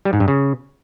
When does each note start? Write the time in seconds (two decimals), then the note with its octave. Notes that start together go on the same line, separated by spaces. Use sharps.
0.05 G3
0.13 G#2
0.20 G2
0.28 C#3